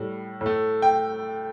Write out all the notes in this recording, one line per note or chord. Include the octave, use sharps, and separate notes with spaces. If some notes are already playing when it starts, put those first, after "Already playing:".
Already playing: A2 G3
A2
A3
G5